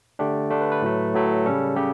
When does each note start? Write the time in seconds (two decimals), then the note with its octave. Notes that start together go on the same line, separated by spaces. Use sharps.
0.19 D3 A3 D4 G4
0.50 D3 A3 D4
0.61 B4
0.72 B4
0.82 A2 F#3 A3
1.14 A2 F#3 A3
1.46 C#3 G3 C#4 A4
1.76 C#3 G4